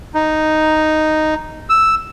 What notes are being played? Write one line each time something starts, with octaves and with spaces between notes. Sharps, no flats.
D#4
E6